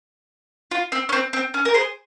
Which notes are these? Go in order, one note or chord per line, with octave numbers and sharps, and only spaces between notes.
F4
C4
C#4
C4
C4
C#4
A#4
G#4 C5